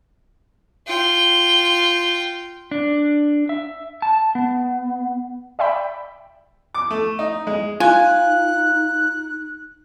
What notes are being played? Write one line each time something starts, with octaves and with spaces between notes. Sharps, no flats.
F4 G5
D4
E5
A5
B3
D5 E5 G5 B5
D6
A3
D#4
G#3
D#4 F4 G#5 F#6